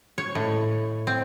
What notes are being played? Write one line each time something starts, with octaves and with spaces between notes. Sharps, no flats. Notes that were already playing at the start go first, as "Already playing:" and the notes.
C#5
A2
C4